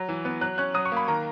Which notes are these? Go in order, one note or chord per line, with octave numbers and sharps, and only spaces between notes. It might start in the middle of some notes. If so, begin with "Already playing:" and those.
Already playing: F#3
E3
B3
F#3 F#6
C#4 F#6
F#3 D#6
C#6
A#3 B5
D#3 A#5